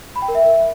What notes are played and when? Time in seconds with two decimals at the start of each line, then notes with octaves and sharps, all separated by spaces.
0.16 B5
0.22 G5
0.28 A#4
0.35 E5